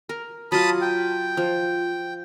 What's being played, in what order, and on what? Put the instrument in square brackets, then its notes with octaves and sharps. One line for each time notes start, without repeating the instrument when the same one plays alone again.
[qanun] A#4
[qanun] F#3 F4 [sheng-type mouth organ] A5 B5 D#6
[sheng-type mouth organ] G5
[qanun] F3